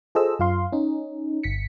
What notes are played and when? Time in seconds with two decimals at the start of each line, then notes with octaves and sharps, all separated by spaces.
0.15 F4 G#4 A4 C5 D#5 E6
0.39 F#2 F4 F5 C6
0.73 C#4 D#4
1.43 G1 B6 C#7